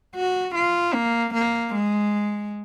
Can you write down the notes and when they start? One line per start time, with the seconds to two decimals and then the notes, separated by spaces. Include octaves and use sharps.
0.15 F#4
0.55 F4
0.94 A#3
1.34 A#3
1.74 G#3